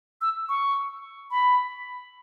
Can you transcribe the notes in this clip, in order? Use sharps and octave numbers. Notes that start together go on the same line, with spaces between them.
E6
C#6
B5